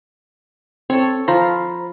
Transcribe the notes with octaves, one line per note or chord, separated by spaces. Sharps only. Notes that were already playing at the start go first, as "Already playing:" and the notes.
C4 A4 C#5
F3 F4 C5 A#5 B5